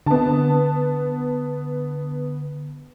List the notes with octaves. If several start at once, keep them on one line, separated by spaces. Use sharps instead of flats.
D3 B3 A5